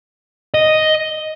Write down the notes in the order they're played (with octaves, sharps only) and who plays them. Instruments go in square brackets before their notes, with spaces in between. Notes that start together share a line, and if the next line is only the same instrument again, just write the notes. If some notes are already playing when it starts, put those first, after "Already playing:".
[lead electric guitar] D#5